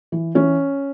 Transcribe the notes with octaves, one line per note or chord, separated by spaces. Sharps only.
E3
E3 C#4